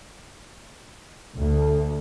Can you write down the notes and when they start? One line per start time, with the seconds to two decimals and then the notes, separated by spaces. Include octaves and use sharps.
1.36 D2